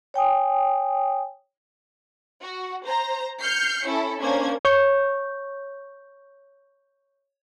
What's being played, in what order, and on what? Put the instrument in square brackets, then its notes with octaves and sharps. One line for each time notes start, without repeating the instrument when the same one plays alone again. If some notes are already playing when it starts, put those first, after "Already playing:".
[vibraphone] C#5 G5 G#5 D#6
[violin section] F#4
C5 A#5
F6 G6 C7 C#7
C#4 E4 A4
A#3 C#4 D4 C5 G#6
[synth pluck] C#5 C#6 G6